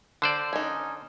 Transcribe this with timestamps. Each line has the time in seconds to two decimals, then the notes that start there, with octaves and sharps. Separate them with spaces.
0.22 D3 C5 D5
0.53 C#4 D#4